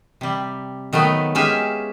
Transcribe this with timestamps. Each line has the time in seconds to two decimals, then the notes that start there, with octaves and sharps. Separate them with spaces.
0.21 C3 G3
0.93 D#3 F#3 A3 B3
1.35 G#3 C#4 G4 E5 F5 G#5